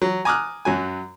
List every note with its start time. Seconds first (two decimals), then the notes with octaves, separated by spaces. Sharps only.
0.02 F#3
0.25 G#5 A#5 D6 D#6 F6 F#6
0.65 F#2 F#3 G#5